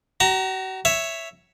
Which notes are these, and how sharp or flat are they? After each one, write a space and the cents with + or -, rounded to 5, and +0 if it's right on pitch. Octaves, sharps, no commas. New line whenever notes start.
F#4 +40 A#5 -5
C#5 +0 E5 +0